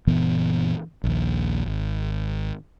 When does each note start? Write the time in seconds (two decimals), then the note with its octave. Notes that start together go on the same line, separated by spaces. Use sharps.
0.07 F#1 A#2 E3 B3
1.04 A#1 D#2
1.66 G#1